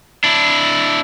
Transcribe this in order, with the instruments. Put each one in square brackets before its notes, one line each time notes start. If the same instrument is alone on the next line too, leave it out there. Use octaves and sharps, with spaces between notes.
[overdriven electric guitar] D4 E4